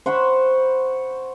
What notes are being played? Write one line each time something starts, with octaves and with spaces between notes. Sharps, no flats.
C5 F#5 B5 C#6